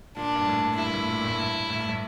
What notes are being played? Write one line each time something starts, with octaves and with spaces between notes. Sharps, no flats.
A#2 D4
G2
A2
G2 E4
A2
A#2
A2
G2
A2
G2
A2